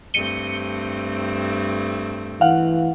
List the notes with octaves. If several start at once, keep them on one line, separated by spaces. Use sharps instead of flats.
G2 A3 C4 C#7 D#7 G7
E3 F5 F#5